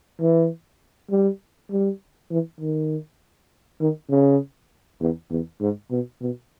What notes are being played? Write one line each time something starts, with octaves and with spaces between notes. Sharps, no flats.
E3
G3
G3
E3
D#3
D#3
C#3
E2
E2
G#2
B2
B2